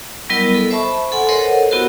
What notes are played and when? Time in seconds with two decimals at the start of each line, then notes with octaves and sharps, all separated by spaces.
0.30 F#3 G3 B3 E4 A#4 D#5
0.54 A4
0.70 C5 E5 A5 B5 C#6
1.12 A4 F#5 G#5 C6
1.29 A4 A#4 C5 C#5 D#5 F#5
1.71 B3 E4 F#4 G4 A#4